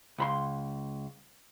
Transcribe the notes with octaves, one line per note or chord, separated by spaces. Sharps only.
C#2 B5 C6